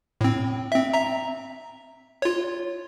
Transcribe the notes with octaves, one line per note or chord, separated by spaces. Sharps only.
A2 C4
C4 E5
E5 A#5
F4 C#5